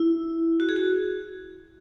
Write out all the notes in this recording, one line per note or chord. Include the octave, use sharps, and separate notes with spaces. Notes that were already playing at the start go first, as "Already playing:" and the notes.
Already playing: E4
F#4
G#4
F#4